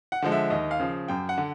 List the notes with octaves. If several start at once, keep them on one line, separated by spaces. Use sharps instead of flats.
F#5
D3 F3 G#3
E5
D#2 D#5
F5
C#3 F3
F#2 G5
F#5
D3